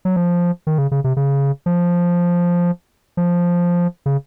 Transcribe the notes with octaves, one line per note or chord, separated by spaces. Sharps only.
F#3
F3
D#3
C#3
C#3
C3
C#3
F3
F3
C#3